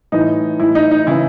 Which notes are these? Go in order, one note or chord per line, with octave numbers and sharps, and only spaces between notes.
A2 E3 D#4
A2 E3 E4
D#4
D#4
C#3 E3 E4